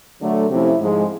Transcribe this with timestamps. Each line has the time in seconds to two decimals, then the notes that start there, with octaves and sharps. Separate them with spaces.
0.22 D3 F#3 A3
0.50 C3 F3 A3 C#4 E4
0.80 G#2 F3 G#3